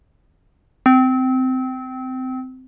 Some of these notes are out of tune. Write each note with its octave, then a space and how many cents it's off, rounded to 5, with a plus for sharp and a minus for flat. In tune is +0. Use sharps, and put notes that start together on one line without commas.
C4 -20